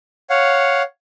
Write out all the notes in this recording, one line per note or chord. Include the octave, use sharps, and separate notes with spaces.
C#5 F5 F#5